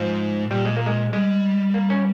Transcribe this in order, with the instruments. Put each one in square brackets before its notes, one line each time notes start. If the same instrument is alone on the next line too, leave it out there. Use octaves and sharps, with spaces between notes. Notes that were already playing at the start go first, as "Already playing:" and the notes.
Already playing: [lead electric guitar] G#2 [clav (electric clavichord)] F3
[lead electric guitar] A#2 [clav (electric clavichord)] G3
[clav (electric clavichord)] G#3
A#3
G#3
[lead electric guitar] G3 [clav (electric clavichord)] G#3
[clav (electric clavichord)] A#3
C#4